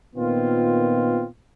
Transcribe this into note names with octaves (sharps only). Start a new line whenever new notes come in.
A#2 D#3 B3 C4 F4